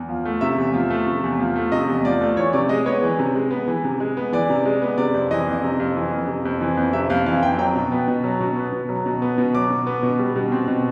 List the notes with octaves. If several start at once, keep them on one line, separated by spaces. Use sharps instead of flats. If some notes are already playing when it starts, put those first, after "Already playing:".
Already playing: E2
F3
A3
C3 E5
E2
F3
A3
C3
E2
F3
A3
C3 D#5
E2
F3 D5
A3
E3 C#5
C3 D5
G#3 D#5
B3 C#5
E3
C3
G#3
B3
E3
C3
G#3
B3
E3 D5
C3
G#3
B3
C3 D5
F2
E3 D#5
F2
C3
F2
E3
F2
C3
F2
E3
F2
C3 E5
F2 F5
E3 F5
F2 G5
F#3 G5
B2
B3
B2
F#3
B2
B3
B2
F#3
B2
B3
B2
F#3 D6
B2
B3
B2
G3
B2
C4
B2